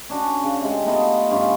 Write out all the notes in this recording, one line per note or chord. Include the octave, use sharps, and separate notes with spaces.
C#4 D4 F#4
C#3
C3 G#3
A3 B3 D#4 F4
G2 C#4 F4 B5